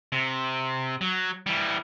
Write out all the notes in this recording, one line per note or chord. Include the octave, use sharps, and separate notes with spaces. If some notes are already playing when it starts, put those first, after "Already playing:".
C3
F#3
E3 G3